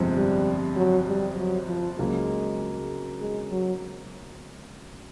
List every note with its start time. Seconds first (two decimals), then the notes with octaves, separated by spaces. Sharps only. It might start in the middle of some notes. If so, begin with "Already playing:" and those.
Already playing: G1 F2 C3 F3 G#3
0.16 G3
0.76 F#3
1.07 G3
1.38 F#3
1.68 F3
1.99 C#2 C#3 F#3 G#3 A#3
3.21 G#3
3.51 F#3